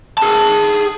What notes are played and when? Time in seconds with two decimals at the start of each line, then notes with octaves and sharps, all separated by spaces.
0.18 G#4 A5